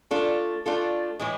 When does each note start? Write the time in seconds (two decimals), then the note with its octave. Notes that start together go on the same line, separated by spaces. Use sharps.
0.11 A3 D4 F4 A4
0.66 A3 D4 F4 A4
1.19 A2 E3 G#3